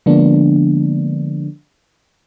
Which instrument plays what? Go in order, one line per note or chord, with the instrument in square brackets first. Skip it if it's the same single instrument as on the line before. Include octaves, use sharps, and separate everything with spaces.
[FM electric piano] D3 F3 G#3 A#3 B3 D4